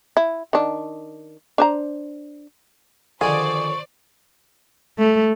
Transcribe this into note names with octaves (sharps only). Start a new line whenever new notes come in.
E4
D#3 D4
D4 C5 A#5
D3 D#3 F3 G#4 C5 D5 C#6
A3